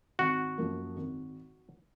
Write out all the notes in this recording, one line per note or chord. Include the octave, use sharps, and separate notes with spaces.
G#1 F#4
F#2 F3 A#3
G#1